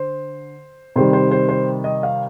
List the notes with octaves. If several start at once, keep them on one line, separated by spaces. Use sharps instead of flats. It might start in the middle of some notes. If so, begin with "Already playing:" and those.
Already playing: D3 C5
C3 D#3 G3 C5
C5
C5
C5
D#5
F5